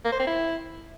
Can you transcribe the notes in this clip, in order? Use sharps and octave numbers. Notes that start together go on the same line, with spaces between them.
A#3
C5
C4
E4